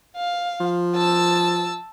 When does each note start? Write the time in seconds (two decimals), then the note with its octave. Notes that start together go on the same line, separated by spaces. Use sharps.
0.17 F5
0.60 F3
0.95 A5 E6